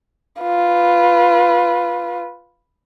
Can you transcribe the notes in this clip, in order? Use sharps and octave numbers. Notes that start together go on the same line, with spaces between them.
F4 B4